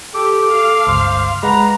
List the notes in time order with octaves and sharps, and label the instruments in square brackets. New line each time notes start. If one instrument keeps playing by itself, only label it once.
[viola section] G4 [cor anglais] A4 [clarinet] D6
[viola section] F5
[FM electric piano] G1 C#2 [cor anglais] C5
[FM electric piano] G#3 F#5 [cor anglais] B4 [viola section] A#5